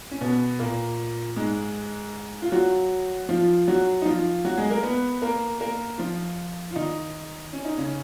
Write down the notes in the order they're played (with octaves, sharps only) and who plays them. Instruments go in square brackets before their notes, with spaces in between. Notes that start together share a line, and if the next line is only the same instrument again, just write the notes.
[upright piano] C#4
B2 B3
A#2 A#3
G#2 G#3
F4
F#3 F#4
F3 F4
F#3 F#4
D#4
F3 F4
F#3 F#4
G#3 G#4
A#3 A#4
B3 B4
A#3 A#4
A#3 A#4
F3 F4
F4
D#3 D#4
C#4
D#4
C#3 C#4